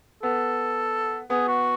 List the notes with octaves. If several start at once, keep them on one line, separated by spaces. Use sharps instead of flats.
B3 A4
B3 G#4
F#4